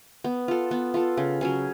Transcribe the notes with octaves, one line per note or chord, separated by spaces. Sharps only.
B3
F4 A4
B3
F4 A4
C#3
F#3 C#4 G#4